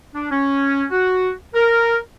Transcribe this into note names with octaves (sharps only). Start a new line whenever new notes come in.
D4
C#4
F#4
A#4